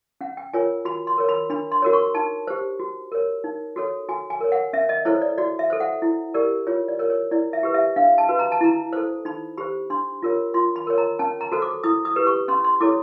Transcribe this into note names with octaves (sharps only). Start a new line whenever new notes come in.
C#4 F#5
G5
F4 A#4 C#5 G#5
F#4 B5
C6
A#4 C#5
B5
D4 B5
C6
F#4 A#4 C#5
C#6
D#4 A5
G4 C5
F#4
A#4 C#5
D#4
F#4 A4 C#5
F#4 G#5
G#5
A#4 C#5
F#5
C#4 E5
D#5
E4 A4 C5 C#5
D5
F#4 D5
E5
A4 C5
F#5
E4
G4 A#4 D5
F4 C#5
D5
A#4 C#5
C#5
E4 D5
E5
G4 B4
E5
D4 F5
A5
F#4 B4
A#5
A5
E4 A#5
A4 C5
D#4 B5
G4 C5 B5
D4 C6
F4 A#4 C#5
F4 C6
B5
A#4 C#5
A#5
C#4 A5
A#5
F#4 A4 C5
D6
E4 D#6
D#6
G4 B4
C#6
C#4 C6
C6
E4 A4 C#5 D6